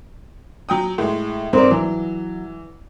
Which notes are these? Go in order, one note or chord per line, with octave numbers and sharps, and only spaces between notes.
F#3 G5 D#6
A2 G#3
G#2 C4 A#4 D5
E3 F#3